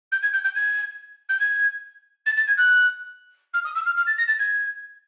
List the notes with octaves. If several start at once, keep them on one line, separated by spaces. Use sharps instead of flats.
G6
G#6
G6
G6
G#6
G6
G#6
A6
A6
G#6
F#6
F6
D#6
E6
F6
F6
A6
A#6
A6
G#6